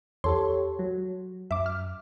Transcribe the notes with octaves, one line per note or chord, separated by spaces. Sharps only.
E2 G4 A4 C#5 C6
F#3
F#2 E5 D6
F6